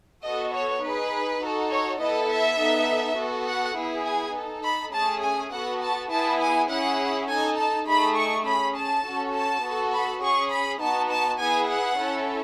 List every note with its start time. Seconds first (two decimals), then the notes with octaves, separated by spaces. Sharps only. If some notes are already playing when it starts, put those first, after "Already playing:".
0.24 B3 F#4 A4 D#5
0.53 C#5
0.82 D#4 G#4 B4
1.41 D#4 F#4 A4
1.71 C#5
2.00 B3 E4 A4 D#5
2.29 E5
2.58 B3 D#4 A4
3.18 B3 F#4 A4
3.47 F#5
3.76 B3 E4 G#4
4.05 G#5
4.34 D#4 A4
4.64 B5
4.93 A3 C#4 G#4 A5
5.23 G#5
5.52 B3 F#4 A4 F#5
5.81 A5
6.11 B3 E4 G#4 A5
6.40 G#5
6.70 C#4 E4 G#4 F#5
7.28 D#4 A4 G#5
7.58 A5
7.87 A3 D#4 G#4 B5
8.17 C#6
8.46 C#4 G#4 B5
8.75 A5
9.04 C#4 F#4 A4
9.34 A5
9.63 B3 F#4 A4
9.93 B5
10.22 C#4 G#4 C#6
10.51 B5
10.81 B3 D#4 F#4 A5
11.10 A5
11.40 B3 E4 G#4 G#5
11.69 F#5
11.99 C#4 E4 A4